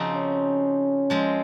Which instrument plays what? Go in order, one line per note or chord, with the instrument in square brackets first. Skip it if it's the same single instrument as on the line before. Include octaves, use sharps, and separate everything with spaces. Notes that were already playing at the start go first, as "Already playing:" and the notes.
Already playing: [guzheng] C#3 F3 C4 D#4 F#4
[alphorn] C#4
[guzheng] F3 G#3 C4